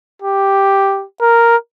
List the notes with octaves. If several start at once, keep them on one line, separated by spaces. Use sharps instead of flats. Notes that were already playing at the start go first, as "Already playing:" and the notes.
G4
A#4